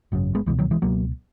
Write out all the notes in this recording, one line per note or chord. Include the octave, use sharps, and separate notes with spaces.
G#1 F#2 C#3
G#3 B3
C#2 B2 E3 G#3
D#3 F#3
E3 G#3
C#2 B2 F#3 A#3